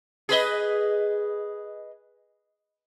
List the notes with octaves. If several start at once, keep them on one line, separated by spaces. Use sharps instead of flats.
G#4 B4 D#5